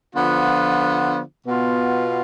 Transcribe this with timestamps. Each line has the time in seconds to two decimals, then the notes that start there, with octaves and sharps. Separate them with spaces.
0.15 D3 F3 B3 F4
1.46 B2 B3 F4